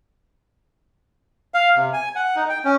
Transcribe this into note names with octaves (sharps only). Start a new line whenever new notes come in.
F5
C3
G#5
F#5
D#4
G5
C#4